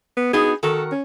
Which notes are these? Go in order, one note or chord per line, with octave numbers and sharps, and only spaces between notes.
B3
B3 D#4 F#4 G#4
D#3 F#4 A4 A#4
C#4